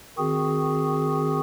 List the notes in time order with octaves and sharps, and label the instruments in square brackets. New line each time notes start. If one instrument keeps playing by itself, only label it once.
[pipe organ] D#3 C4 F#4 G#4